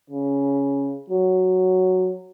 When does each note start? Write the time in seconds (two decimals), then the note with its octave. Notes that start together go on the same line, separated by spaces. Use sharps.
0.10 C#3
1.10 F#3